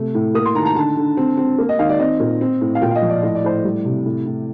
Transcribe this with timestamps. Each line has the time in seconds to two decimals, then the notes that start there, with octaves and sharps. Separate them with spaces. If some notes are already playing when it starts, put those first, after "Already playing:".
Already playing: C3 A3
0.15 A2
0.34 A#3 D#6
0.46 C6
0.55 D#3 A#5
0.61 A5
0.66 A#5
0.76 D3 A5
0.97 D3
1.17 C4
1.37 C4
1.58 A#3
1.69 D#5
1.79 D#3 F5
1.89 D5
1.99 C4 D#5
2.20 A#2
2.41 C4
2.61 A2
2.75 F5
2.82 A#2 G5
2.91 F5
2.95 D#5
3.02 F3
3.09 D5
3.23 A2 D#5
3.35 D5
3.44 A2 C5
3.57 D5
3.64 G3
3.85 C3
4.05 A2
4.26 A2